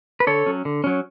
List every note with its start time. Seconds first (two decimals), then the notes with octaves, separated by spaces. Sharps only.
0.20 B4
0.27 D3 A4 C#5
0.46 F#3 C#4
0.65 D3
0.84 F#3 C#4